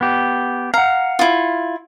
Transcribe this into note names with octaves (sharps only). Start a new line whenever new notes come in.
B3 G4
F5 F#5 A#5
E4 F4